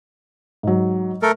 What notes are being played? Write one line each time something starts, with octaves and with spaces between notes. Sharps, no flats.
G#2 F#3
A3 A4 A#4